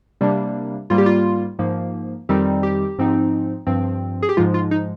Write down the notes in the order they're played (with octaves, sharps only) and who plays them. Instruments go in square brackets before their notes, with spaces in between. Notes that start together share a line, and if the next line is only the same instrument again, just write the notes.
[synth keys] C3 G3 A#3 D4
G#2 G3 A#3 F4
G4
F4
G#2 F3 A#3
F2 D#3 G3 C4 D#4 G4
G4
G#2 F3 C4 D#4
G2 F3 C4
G#4
G4
G#2 F3 G#3 F4
F4
D#4